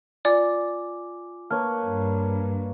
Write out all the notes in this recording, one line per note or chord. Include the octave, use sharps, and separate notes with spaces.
F4 D5 G#5 D6
A#3 B4 C#5 A5 F6
G2